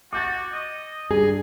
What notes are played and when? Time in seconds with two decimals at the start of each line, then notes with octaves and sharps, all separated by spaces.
0.13 F#4 D6 G6 A6
0.52 D#5
1.11 G2 G#4